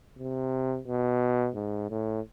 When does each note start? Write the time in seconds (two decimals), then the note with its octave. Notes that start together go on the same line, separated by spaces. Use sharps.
0.19 C3
0.88 B2
1.55 G#2
1.90 A2